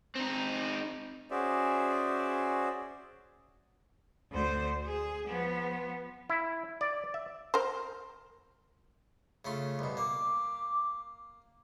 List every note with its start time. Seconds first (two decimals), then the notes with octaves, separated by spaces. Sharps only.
0.15 C4 D#4
1.30 C#4 F#4 G#4 C5 D5 E5
4.31 D2 C5
4.85 G#4
5.27 F3 B3
6.30 E4
6.81 D5
7.14 E5
7.54 A#4 C5
9.45 C#3 A3 F4
9.79 C2 B2
9.97 A#3 D6